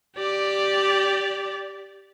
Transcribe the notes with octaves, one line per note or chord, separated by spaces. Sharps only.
G4 D5